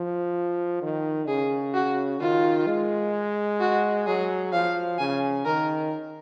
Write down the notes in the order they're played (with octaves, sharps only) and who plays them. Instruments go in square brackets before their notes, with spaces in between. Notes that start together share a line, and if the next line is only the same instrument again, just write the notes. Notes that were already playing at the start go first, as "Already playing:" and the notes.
Already playing: [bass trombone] F3
D#3
[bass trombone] C#3 [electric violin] G#4
[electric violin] F#4
[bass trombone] D#3 [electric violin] F4
[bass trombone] G#3
[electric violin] F#4
[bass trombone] F#3 [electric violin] G#4
[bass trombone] F3 [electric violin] F5
[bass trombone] C#3 [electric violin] G#5
[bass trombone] D#3 [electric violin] A#4